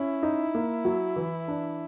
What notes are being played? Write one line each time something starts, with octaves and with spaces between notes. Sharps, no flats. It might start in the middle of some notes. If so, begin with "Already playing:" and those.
Already playing: C#4 E4
D#4
A#3
F#3
E3
D4